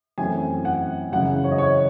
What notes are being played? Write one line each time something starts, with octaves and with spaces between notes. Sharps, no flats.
F#2 E3 A3 C4 G#5
F#5
F#2 C#3 E3 F#5
C#5
D#5
C#5